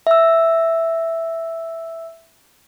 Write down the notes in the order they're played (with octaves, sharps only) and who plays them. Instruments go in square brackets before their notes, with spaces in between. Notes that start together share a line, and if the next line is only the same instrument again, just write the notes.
[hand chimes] E5 E6